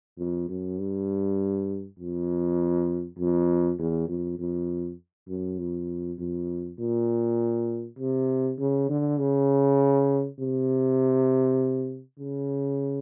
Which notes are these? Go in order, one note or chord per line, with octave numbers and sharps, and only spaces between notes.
F2
F#2
G2
F2
F2
E2
F2
F2
F#2
F2
F2
A#2
C3
C#3
D3
C#3
C3
C#3